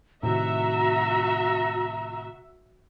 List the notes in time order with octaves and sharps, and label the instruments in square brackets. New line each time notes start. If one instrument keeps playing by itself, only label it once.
[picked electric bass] A2 C3 D#3 [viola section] F#4 E5 [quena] A#5